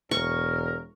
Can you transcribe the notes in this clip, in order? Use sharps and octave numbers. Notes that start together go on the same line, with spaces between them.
E1 A#4 C#6